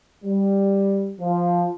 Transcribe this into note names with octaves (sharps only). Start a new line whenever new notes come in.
G3
F3